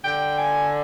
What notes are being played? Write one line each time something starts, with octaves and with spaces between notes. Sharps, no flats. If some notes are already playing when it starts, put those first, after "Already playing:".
D3 G5
G#5